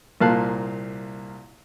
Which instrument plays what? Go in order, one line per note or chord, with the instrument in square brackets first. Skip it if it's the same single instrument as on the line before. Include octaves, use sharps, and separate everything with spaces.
[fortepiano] C2 A#2 A#3 F5 A5 F#6